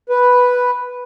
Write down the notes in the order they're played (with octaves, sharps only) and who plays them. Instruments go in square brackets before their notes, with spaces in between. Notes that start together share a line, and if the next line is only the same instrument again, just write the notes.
[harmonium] B4